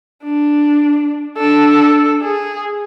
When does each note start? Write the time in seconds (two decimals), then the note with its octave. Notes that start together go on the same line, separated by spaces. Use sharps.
0.24 D4
1.37 D4 A4
2.23 G#4